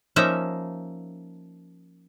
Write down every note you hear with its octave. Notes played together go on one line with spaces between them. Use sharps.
F3 A#3 C#4 D#4 E5 A#5